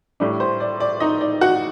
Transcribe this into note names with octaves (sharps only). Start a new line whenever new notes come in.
A2 G3 D4 D5
C5
D5
D5
D#4 D#5
D5
F#4 F#5